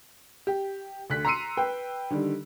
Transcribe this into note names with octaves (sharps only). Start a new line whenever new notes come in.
G4
D2 D3 F#6 B6
A#5 C6 E6 C7 C#7 D#7
B4 G5
D3 D#3 G3